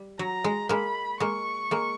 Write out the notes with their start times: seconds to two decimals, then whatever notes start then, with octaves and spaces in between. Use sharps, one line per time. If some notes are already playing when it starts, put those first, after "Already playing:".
Already playing: G3
0.19 F#3 A#5
0.44 G#3
0.69 G#3 A#3 B5
1.20 G#3 A#3 C#6
1.71 G#3 A#3